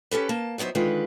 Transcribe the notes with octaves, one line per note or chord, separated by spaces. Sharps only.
C#4 G4 A4 B4
A#3 A5
D#3 F#3 B3 E4 C5
D3 D#3 G#3 F4 B4